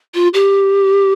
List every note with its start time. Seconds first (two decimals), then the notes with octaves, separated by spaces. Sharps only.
0.14 F4
0.34 G4